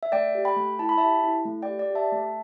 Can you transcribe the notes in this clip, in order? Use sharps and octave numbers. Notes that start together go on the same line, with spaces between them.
E5
A3 D5 G5
G4
G5 B5
A3
E4 A5
B5
G4 E5 A5
E4
A3
G4 D5 G5
D5
G4 E5 A5
A3